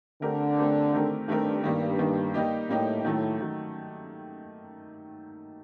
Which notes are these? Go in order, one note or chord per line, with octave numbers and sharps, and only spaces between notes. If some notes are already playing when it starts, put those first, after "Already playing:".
D3 A3 C4 G4 A#4
A3 C4 G4 A#4
D#3 A3 C4 G4 A#4
G2 D#3 A3 C4 G4 A#4
G2 D#3 G3 A#3
D#3 G3 A#3
G3 A#3 D#4 G4
A2 G3 A#3 D#4 G4
A2 D#3 F#3 A3
D#3 F#3